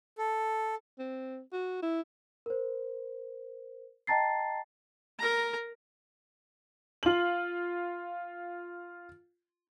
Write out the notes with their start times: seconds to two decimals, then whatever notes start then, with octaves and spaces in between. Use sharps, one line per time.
0.18 A4
0.99 C4
1.53 F#4
1.83 E4
2.46 A#4 C5
4.07 D#5 G5 A5 A#5 A6 C7
5.19 A#4 A#5
7.03 F4 F#7